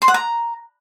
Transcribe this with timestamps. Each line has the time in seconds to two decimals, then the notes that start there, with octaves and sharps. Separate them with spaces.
0.02 C6
0.08 F#5
0.14 A#5